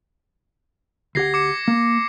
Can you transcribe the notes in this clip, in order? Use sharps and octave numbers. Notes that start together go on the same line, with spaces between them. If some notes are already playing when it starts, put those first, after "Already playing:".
D2 G4 F#5 G#6 A#6 C7
D6 C#7
A#3